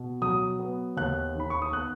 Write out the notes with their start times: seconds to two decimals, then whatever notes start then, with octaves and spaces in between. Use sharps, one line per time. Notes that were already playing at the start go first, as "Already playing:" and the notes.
Already playing: B2
0.22 F#3 D#6
0.59 B3
0.97 D#2 F#6
1.35 D#3 B5
1.50 C#6
1.62 D#6
1.72 B3 F#6